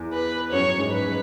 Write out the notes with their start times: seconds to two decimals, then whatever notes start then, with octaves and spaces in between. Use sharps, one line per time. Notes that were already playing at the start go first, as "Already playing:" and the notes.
Already playing: E2 E3
0.13 B4
0.52 F#2 F#3 C#5
0.79 G#2 G#3
0.92 B4
1.05 G#3